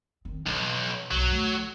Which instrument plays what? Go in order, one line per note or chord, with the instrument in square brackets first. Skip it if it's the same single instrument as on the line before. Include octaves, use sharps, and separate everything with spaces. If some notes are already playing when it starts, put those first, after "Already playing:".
[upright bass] D#3 C4
[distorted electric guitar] B1 [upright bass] E3
[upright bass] B1 [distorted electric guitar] F#3
[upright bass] D3 A3